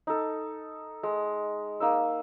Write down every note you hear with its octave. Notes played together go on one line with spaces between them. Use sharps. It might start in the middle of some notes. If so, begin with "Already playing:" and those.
D#4 A4
G#3
A#3 D#4 E6